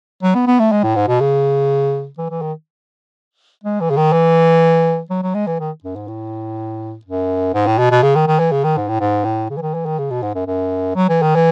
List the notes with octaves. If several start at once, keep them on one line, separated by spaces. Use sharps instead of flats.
F#3
B3
B3
A3
G#3
A2
G#2
B2
C#3
E3
E3
D#3
G#3
E3
C#3
D#3
E3
F#3
F#3
G#3
E3
D#3
F#2
G#2
A2
F#2
G#2
A2
B2
B2
C#3
D#3
D#3
E3
C#3
D#3
G#2
A2
G#2
A2
C#3
E3
D#3
E3
D#3
C#3
B2
G#2
F#2
F#2
F#3
E3
D#3
E3